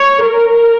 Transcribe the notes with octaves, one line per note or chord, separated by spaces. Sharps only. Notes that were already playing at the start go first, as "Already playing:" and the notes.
Already playing: C#5
A#4